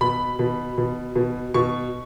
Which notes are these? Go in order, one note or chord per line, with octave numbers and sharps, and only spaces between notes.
B2 B5
B2
B2
B2
B2 C#6